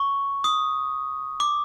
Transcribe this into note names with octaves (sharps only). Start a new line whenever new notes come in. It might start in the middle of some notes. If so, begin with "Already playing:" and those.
Already playing: C#6
D#6
D6